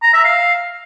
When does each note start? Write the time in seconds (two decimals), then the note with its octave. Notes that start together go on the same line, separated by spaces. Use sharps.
0.03 A#5
0.14 E5
0.25 F5